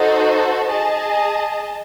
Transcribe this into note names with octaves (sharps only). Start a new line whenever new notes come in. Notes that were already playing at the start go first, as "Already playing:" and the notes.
Already playing: D#4 F#4 A4 C5
G#4 D#5 A5